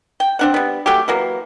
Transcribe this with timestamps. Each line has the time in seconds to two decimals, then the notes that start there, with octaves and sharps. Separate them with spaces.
0.20 G5
0.39 C4 D4 F#5
0.54 G3 B3
0.86 F#3 A3 C#4 G4
1.08 E3 F#3 A#3